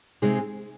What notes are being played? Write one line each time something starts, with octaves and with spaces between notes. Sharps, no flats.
C3 G#3 C4 D#4 G#4